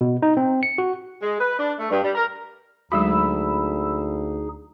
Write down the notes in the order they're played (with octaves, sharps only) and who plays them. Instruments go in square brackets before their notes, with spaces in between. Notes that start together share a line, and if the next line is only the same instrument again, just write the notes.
[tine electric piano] B2
D#4
C4
C#7
F#4
[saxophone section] G#3
B4
D4
A3
G2
G3
A#4
[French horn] D2 [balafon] F#3 G#3 F#4 [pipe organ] D#4 G#4 [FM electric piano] B5 E6